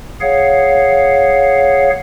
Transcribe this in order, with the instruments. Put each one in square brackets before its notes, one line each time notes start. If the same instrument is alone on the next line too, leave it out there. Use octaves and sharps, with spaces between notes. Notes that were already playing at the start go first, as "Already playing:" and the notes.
[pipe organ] G#4 C#5 F5 F#5